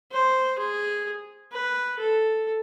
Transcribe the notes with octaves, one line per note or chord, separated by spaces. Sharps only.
C5
G#4
B4
A4